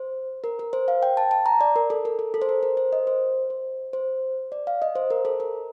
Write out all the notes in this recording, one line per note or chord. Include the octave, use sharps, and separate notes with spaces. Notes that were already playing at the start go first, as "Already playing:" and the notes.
Already playing: C5
A#4
A#4
C5
F5
G5
A5
A5
A#5
D5
A#4
A4
A#4
A4
A4
C5
A#4
A#4
C5
D#5
C5
C5
C5
D5
F5
D#5
C5
A#4
A4
A#4